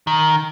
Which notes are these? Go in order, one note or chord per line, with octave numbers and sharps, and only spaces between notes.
D#3